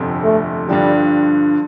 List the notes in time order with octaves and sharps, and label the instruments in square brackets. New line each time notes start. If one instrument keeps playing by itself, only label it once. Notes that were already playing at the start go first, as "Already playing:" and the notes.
Already playing: [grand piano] G1 F2 C3
[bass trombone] A3
[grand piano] G2 D3 F3 [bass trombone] G3